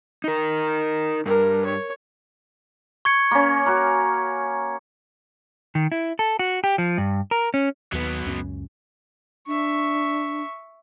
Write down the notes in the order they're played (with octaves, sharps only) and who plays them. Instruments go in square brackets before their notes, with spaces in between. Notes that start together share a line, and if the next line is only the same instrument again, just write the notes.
[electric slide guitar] D#4 A#4
[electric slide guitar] G2 [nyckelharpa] A#4
[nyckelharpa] C#5
[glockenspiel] C#6 G#6 C#7
[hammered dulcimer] A#3 C#4
F#4 A#4
[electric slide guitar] D#3
E4
A4
F#4
G4
F3
G2
A#4
C#4
[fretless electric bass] D#2 [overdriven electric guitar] F#3 B3
[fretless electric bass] C#2 F#2 C#4
[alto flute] D4 [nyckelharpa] E5 C#6